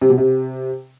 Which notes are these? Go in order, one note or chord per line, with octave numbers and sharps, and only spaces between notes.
C3
B2
C3